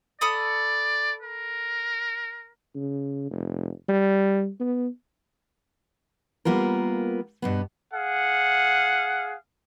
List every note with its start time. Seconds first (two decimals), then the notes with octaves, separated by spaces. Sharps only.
0.21 A4 D5 B5 D#6
1.22 A#4
2.75 C#3
3.30 F1
3.89 G3
4.60 B3
6.45 G3 A#3 B3 F4 A#4
7.42 G2 B2 B3
7.93 G#4 F5 F#5